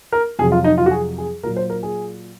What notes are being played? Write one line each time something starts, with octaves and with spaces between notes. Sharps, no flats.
A#4
F2 C3 F#3 G#4
F4
D#4
F4
F#4
G#4
G#4
A#2 F#3 A#4
C5
A#4
G#4